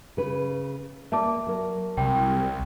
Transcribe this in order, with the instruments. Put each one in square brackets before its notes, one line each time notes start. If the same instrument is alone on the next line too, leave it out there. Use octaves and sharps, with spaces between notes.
[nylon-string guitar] C#3 B4
[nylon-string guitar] A#3 D5 [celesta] E5 A5 D6
[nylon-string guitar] F#3 A#4
[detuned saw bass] C2 [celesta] G5